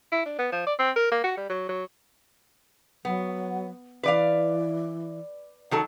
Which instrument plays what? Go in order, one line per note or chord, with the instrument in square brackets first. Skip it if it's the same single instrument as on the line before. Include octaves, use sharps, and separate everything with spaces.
[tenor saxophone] E4
D4
B3
F3
D5
C4
A#4
A#3
F#4
G3
F#3
F#3
[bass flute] F#3 [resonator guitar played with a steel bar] B3
[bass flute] E3 [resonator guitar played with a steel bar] B4 D5 F5
[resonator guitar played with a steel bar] D#3 F#3 A4